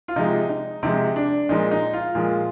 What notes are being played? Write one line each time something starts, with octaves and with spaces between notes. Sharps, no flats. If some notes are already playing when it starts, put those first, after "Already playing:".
F4
C3 F3 G#3 D#4
D#4
C3 F3 G#3 D#4
D4
A#2 F3 G#3 D#4
D#4
F4
A#2 F3 G#3